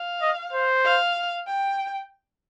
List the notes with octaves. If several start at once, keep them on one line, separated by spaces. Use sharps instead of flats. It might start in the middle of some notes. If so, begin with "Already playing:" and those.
Already playing: F5
D#5
C5
F5
G5